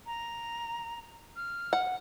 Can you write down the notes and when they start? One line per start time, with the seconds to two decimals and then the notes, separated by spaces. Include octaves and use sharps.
0.06 A#5
1.36 F6
1.73 F#5